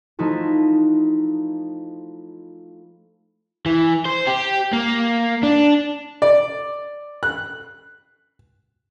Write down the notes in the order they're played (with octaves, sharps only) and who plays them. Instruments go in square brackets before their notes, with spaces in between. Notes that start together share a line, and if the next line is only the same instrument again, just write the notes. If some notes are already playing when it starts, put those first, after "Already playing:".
[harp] F3 A3 D#4 E4 F#4
[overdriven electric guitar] E3
C5
G4
A#3
D4
[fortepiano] D5
F#6